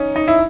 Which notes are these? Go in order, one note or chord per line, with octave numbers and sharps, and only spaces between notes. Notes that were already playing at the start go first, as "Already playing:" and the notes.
Already playing: C#4 D#4
D#4
E4